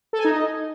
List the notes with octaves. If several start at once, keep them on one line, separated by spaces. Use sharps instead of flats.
A4
G#5
D#4
D#5